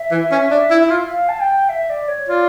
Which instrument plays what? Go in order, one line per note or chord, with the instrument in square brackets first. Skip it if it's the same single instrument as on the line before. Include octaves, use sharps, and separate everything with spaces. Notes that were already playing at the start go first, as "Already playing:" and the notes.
Already playing: [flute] E5
[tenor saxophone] E3
C#4
D4
E4
E4
F4
[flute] F5
A5
G5
E5
D5
C#5
[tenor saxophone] F4 [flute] D5